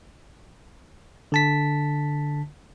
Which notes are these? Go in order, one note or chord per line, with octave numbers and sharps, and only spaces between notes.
D3 A5 B6